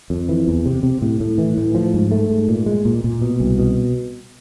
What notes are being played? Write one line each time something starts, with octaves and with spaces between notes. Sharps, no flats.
F2
E3
E2
C3
C3
A2
A2
E3
A2
F3
G#2
A3
G#2
A#2
G#3
A#2
A#2
B2
C2
B2